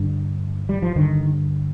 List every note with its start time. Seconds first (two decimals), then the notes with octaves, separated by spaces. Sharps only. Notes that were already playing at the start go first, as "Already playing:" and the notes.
Already playing: G2 D3
0.69 G3
0.82 F3
0.96 G2 D3 D#3